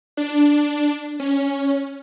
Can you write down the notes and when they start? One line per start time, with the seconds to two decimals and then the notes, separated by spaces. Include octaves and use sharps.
0.17 D4
1.20 C#4